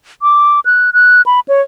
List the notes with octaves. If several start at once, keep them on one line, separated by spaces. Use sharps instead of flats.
D6
F#6
F#6
B5
C#5